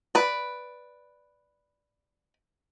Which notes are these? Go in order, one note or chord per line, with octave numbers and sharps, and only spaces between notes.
B4 D5